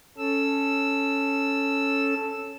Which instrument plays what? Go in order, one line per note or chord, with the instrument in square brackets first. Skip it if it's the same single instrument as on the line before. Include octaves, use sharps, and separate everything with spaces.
[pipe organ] C#4 A4 E6